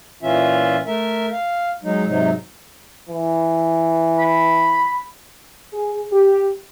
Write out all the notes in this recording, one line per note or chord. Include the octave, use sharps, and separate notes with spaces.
A#2 E3 C#4 F4 E5
A3 A#4 E5
F5
F#3 G#3 D#4
G#2 C3 F#3 D#4
E3
B5
G#4
G4